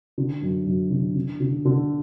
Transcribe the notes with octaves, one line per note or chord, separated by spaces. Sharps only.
D3
F#2
F#2
D3
D3
D3
D3